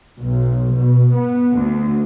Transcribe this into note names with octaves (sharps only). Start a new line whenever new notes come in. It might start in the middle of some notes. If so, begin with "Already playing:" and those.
B1
B2
B3
D2